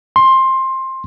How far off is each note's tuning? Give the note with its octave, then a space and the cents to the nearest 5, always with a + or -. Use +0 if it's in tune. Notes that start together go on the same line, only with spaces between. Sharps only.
C6 +15